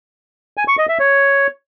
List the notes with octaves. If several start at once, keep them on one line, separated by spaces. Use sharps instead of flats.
G#5
C#6
D#5
E5
C#5